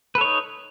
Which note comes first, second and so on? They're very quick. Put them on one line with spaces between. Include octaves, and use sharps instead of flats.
B4 A4 C#5 D#4